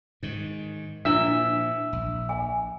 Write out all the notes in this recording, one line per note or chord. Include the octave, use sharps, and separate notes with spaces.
G#2 D#3
A#2 F3 D4 E4 E5 E6
A#1
G#5